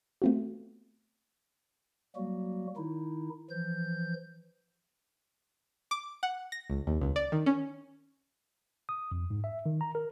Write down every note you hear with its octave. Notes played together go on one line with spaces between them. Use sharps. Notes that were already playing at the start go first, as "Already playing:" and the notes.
A3 B3 C4 F4 F#4
F#3 G3 A#3 F#4
D#3 D#4 E4
E3 F3 G6
D6
F#5
A#6
C#2
D#2
C#2
D5
D#3
C#4
D#6
F2
G#2
E5
D#3
A#5
A#4